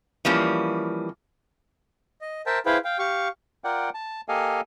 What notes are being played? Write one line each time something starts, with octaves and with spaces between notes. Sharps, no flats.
E3 F3 G3 A#3 C#4
D#5
A#4 C5 E5 G5 A5
E4 G#4 B4 C5 F5 G5
F5 G5
G4 F5 C#6
F4 A#4 D5 F#5 G5
A5
A#3 G4 A4 D#5 F5 G#5